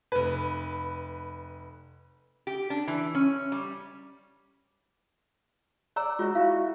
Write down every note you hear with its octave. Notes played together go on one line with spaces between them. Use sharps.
F1 B4
G4
D4
E3
C#4
G3
C#5 D5 A#5 E6
G#3 F4 F#4 C#5
E4 F#4 F5